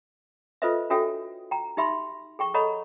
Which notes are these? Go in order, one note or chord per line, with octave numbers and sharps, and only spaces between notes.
F4 A4 B4 C5 D#5 E5
D4 F#4 A4 C#5 E5 G5
G5 A#5
D#4 G4 E5 B5 C6
G#4 G5 C#6
A4 C#5 D#5 F#5 A#5 B5